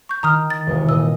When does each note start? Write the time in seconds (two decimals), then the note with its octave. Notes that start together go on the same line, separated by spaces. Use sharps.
0.09 C#6 G6
0.23 D#3 A#5 D#6 F6
0.50 A6
0.67 E1 C2 D#5
0.89 A#2 D#5 E6